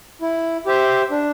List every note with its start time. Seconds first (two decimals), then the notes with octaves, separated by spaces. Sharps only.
0.21 E4
0.66 G4 C5 E5
1.11 D4